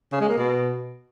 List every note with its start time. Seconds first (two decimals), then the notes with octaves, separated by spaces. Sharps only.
0.12 C#3
0.21 G#3
0.29 A#3
0.37 B2